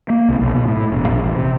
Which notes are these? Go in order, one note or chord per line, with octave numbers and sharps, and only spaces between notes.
A#3
C2
B1
B2
A2
E1
A#1
A1
C3